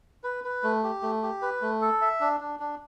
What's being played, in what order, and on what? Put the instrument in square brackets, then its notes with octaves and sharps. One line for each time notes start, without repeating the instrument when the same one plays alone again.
[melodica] B4
B4
A3
G4
A3
G4
B4
A3
A4
E5
D4
D4
D4